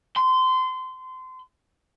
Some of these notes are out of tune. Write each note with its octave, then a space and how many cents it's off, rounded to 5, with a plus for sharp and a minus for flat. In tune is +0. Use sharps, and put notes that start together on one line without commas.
C6 -25